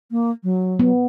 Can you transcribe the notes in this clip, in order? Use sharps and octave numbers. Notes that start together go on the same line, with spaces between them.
A#3
F#3
B3